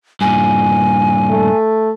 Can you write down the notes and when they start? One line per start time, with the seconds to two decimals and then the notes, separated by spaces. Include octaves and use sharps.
0.21 G2 A#2 G#5
1.30 A3